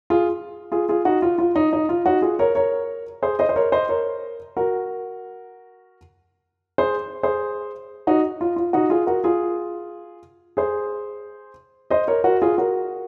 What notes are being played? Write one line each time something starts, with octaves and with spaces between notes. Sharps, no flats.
F4 G#4
F4 G#4
F4 G#4
D#4 F#4
F4
F4
D#4
D#4
F4
D#4 F#4
F4 G#4
A#4 C#5
A#4 C#5
G#4 C5
C5 D#5
C5
A#4 C#5
C5 D#5
A#4 C#5
F#4 A#4
G#4 C5
G#4 C5
D#4 F#4
F4
F4
D#4 F#4
F4 G#4
F#4 A#4
F4 G#4
G#4 C5
C5 D#5
A#4 C#5
F#4 A#4
F4 G#4
F#4 A#4